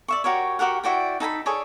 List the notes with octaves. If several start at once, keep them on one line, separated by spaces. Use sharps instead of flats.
D5 E5 C#6
F#4 G4 A#4 C#5
F#4 G4 A#4 F#5
E4 F#4 D5 G5
D#4 A4 G#5 B5
G#4 A4 C#5 D5